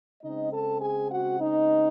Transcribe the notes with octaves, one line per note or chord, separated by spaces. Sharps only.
C#3 G#3 C4 D#4 D#5
A4 A5
G#4 G#5
F#4 F#5
D#4 D#5